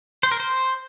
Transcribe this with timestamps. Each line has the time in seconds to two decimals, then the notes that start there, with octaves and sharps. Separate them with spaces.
0.23 C5
0.32 A#4
0.40 C5